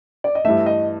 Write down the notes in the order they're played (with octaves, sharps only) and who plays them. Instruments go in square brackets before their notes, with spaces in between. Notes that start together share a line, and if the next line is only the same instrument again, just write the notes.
[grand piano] D5
D#5
[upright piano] G2 E3 A3 [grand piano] E5
[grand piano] D#5